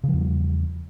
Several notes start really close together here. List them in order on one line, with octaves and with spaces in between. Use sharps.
C#3 F3 E2 G3